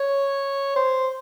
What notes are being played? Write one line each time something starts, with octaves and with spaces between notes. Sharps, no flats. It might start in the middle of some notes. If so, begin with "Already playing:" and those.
Already playing: C#5
C5